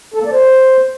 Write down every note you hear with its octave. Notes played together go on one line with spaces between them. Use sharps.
A4
A#3
D5
C5